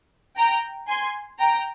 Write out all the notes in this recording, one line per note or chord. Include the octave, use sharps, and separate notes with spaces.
G5 A#5
G#5 C6
G5 A#5